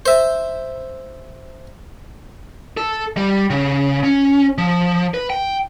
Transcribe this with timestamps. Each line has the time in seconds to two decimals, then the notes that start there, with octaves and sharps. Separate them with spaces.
0.06 C5 E5
2.77 A4
3.17 G3
3.50 C#3
4.04 C#4
4.58 F3
5.14 B4
5.30 G5